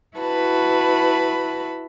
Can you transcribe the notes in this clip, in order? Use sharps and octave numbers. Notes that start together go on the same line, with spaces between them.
E4 F#4 B4 A5 B5